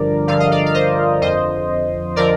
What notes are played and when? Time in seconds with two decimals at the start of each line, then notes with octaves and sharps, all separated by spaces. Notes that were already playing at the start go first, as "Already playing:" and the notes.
Already playing: G2 D3 F3 A#4 D5
0.28 G2 D3 F3 F5
0.40 D#5
0.52 D5 F5
0.66 F5
0.74 C5 D#5
1.21 F2 D3 F3 C5 D#5
2.16 D3 F3 A#4 D5